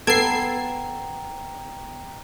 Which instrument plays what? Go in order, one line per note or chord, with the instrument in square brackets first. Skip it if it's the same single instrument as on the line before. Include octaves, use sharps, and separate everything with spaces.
[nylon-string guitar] B3 [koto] A4 [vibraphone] G5 A#5 [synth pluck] G#6 C7